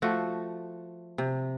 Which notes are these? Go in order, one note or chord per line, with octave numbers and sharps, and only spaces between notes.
F3 A3 F#4
C3